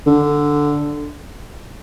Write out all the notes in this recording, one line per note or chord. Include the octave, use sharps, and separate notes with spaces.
D3